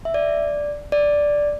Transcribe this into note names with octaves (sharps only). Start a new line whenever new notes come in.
E5
D5
D5